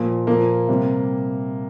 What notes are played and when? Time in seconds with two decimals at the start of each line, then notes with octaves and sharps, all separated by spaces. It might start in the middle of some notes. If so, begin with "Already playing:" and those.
Already playing: A#2 F3 A#3
0.27 A#2 F3 A#3
0.68 C3 G3